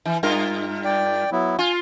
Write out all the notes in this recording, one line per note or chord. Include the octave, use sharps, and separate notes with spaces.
E3
G2 F4 A#4
D5 G5
F#3 B3 E4
F4 G#5